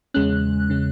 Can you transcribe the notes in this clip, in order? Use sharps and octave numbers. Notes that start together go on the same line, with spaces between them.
E2 C#3 G#3 C#4 F#6
C#3 G#3 C#4